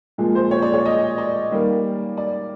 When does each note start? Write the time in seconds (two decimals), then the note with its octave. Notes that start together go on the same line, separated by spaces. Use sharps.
0.18 A#2 F3 G#3
0.35 C5
0.51 C#5
0.62 D5
0.73 C#5
0.85 D#5
1.18 D5
1.51 D#3 G3 A#3
2.17 D5